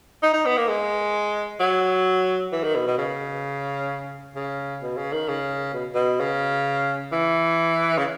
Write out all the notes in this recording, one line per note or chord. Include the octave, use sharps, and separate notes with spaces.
D#4
D#4
B3
A#3
G#3
F#3
E3
D#3
B2
B2
C#3
C#3
B2
C#3
D#3
C#3
B2
B2
C#3
E3
C#3